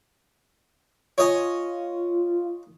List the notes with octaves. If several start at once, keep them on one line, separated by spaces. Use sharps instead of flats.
F4 C#5 D#5 G#5